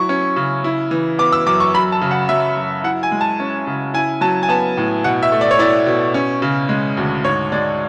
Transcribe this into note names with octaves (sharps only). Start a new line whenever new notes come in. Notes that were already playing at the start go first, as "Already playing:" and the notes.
Already playing: F#3 E4 C#6
C#4
C#3
E4
E3
B3 D6
E6
F#2 D6
C#6
F#2 B5
A5
C#3
F#5
F#3 E5
F#2
E4 F#5
G#5
G#3
A5
C#4
C#3
E4 G#5
F#3 A5
G#5
B3 A5
A2
B2 F#5
E5
A3
D5
C#5
E4 D5
B2
C#4
C#3
G#3
D2
G#2 C#5
G#3 D5